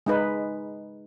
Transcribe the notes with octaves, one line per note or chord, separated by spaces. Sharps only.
G#3 D#4 B4